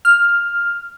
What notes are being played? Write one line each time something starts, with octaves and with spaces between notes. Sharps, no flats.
F6